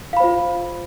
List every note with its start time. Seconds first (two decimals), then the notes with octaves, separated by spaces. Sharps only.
0.13 F5
0.17 B5
0.20 C5
0.24 F4